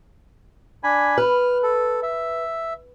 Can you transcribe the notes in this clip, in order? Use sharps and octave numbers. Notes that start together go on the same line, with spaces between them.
D4 G#5 B5
B4 F6
A4
E5